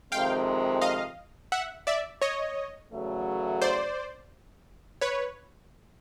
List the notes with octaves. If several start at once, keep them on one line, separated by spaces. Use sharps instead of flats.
F2 C3 D#3 G#3 C4 F5 G5
D#5 F5
E5 F#5
D5 E5
C#5 D#5
E2 C#3 F#3 A3
C5 D5
B4 C#5